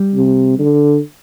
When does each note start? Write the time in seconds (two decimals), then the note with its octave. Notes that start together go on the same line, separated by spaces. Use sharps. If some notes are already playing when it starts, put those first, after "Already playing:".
Already playing: G3
0.15 C3
0.59 D3